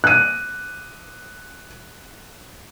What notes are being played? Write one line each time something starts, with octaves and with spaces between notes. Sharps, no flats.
F#6 D#7